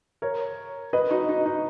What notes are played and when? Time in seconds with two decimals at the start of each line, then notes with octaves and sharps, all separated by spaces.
0.22 A#4 C#5
0.93 B4 D#5
1.11 D#4 F#4
1.29 D#4
1.46 D#4